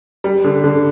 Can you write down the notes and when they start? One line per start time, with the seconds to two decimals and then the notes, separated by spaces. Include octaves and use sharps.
0.24 G3
0.44 D3
0.64 D3